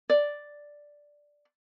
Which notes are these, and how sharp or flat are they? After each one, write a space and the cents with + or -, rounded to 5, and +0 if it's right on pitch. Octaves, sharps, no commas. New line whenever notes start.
D5 +0